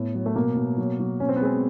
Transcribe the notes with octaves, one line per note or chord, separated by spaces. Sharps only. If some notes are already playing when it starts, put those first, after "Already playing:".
Already playing: A2 B3
F#3
A3
B2 A#3
B2
F#3
F#3
B2 C#4
C4
B3
G#3 C4